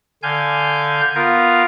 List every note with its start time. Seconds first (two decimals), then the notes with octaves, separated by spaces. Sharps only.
0.23 D3 F5 G#5 G6
1.15 B3 F4 A#4 F5